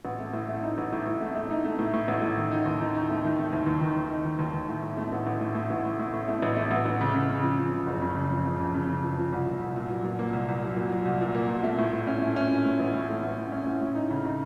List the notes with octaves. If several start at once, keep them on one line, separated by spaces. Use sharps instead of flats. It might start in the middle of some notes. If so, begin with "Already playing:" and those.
A1
A3
A2
A3
D#4
A1
A2
A2
A3
A3
D#4
A3
A2
A2
A1
A2
D#3
D#4
D#2
D#4
D#4
A3
D#3
A3
D#2
D#2
D#3
D#2
D#4
D#3
D#2
D#2
A2
A2
A3
A1
A1
A2
A2
A1
A2
A2
A2
A3
A1
A3
A1
A1
C#3
C#3
C#3
F3
C#3
C#3
F#1
C#3
F2
F3
C#3
F2
C#3
C#3
F3
F3
C2
A#2
C2
A#2
F#3
A#2
A#3
C2
C2
F#3
A#2
F#3
C2
A#2
A#3
A#2
A3
A2
A2
C#4
A3
C#4
A2
A2
A1
A2
A3
A1
A2
C#4
A2
A2
D#4
C#3
D#4